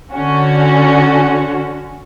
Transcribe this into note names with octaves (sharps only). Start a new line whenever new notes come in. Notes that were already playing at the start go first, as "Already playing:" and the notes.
D3 C#4 F#4